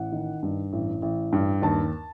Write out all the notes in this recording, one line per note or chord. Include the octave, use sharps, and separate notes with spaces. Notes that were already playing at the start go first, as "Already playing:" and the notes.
Already playing: A1 F#5
D#3
G2
A1
A1
G2
D#2 A5